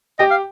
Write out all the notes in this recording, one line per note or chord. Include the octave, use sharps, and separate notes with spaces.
G4 D#5 G5
F5